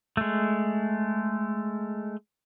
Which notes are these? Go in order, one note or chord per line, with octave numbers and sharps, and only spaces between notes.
G#3 A3